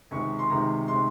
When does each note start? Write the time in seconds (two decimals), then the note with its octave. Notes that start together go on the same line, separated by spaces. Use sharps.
0.11 C#2 C3 D#3 G#3 C#6
0.39 C6
0.50 C#2 C3 D#3 G#3 A#5
0.88 C3 D#3 G#3 C6